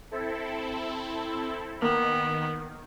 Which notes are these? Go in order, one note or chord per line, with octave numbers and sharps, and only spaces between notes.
C4 E4 A4
D#3 A#3 B3